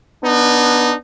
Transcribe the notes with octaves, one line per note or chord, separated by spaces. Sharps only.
B3 D4 D#4